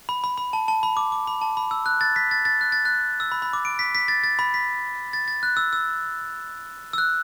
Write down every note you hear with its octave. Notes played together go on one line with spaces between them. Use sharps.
B5
B5
B5
A5
A5
B5
D6
D6
B5
A5
B5
E6
F#6
A6
B6
A6
A6
F#6
A6
F#6
E6
B5
B5
D6
D7
B6
B6
A6
A6
B5
B6
A6
A6
F#6
E6
E6
E6
F#6